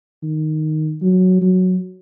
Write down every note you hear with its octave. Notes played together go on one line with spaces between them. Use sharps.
D#3
F#3
F#3